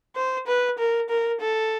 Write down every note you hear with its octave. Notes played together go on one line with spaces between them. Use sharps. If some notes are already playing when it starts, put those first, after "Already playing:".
C5
B4
A#4
A#4
A4